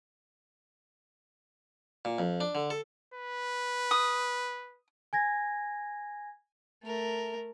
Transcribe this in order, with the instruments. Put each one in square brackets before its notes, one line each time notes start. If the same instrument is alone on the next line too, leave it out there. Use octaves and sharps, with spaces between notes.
[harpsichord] A#2
F2
D4
D3
A4
[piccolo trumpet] B4
[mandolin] D#6
[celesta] G#5 G#6 A#6
[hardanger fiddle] A3 A#4